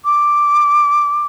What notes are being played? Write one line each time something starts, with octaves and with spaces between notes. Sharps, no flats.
D6